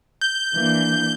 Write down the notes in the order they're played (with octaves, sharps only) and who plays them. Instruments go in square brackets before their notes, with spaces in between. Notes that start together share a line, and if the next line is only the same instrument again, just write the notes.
[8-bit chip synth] G6
[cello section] E3 A#3 D4